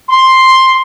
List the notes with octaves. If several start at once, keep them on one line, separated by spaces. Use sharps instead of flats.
C6